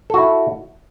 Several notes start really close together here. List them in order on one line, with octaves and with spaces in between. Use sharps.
A4 F#4 E4